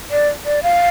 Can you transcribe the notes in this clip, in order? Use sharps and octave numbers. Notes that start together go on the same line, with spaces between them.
D5
D5
F5